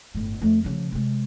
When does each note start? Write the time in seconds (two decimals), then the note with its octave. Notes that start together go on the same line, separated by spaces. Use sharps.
0.15 G1 A2
0.42 F2 A3
0.64 C#3 F3
0.92 C3 G#3